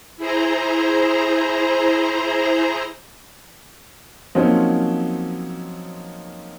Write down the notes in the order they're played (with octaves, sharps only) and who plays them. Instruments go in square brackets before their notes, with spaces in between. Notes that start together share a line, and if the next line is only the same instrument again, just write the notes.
[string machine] E4 G#4 C5 A#5
[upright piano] F3 F#3 A#3 C4 C#4 D#4